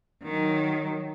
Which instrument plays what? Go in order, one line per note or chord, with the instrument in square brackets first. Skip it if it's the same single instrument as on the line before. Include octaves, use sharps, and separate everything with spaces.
[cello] D#3 F#3